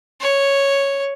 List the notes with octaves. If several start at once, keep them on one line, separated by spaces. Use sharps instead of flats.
C#5